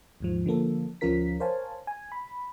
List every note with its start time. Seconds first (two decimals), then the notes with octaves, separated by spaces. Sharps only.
0.20 D#2 G#2 F3
0.46 D3 F3 A#3 A4
1.01 D2 F3 C#4 F4 A#4 B6
1.40 A#4 C5 C#5 F5 G#5 A5
1.87 G#5
2.12 B5